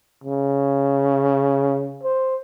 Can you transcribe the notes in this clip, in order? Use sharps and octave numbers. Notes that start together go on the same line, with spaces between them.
C#3
C5